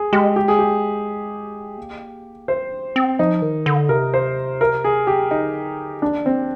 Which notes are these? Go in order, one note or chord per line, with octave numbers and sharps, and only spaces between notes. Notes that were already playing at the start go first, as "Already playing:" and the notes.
Already playing: G#4
G#3 G4
G4
G#4
G4
A#3
C4 C5
D4
C4
F3 D#4
D#3
D3
C3 A#4
C5
A#4
G#4
G4
D3 D#4
D#3 D4
C4